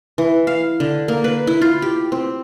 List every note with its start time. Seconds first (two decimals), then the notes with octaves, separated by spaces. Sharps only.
0.18 E3
0.47 F5
0.80 D3
1.08 A#3
1.24 B4
1.47 E4
1.61 F4
1.82 G4
2.12 C4